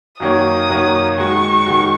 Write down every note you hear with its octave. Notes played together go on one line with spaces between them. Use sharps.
F#2 D#3 A#3 F#4 C#5 D#6
F#2 D#3 A#3 F#4 C#5
D#3 G#3 F#4 C#6
D#3 G#3 F#4